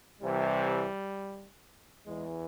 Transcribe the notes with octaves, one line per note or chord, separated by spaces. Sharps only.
C2 C3 E3 G3
E2 E3 G#3